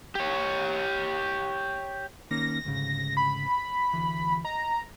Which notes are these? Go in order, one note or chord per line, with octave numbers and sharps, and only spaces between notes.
G4 C#5
D#3 A#3 C#4 A#6
D2 G#2 C#3
B5
D2 E3
D#5 A#5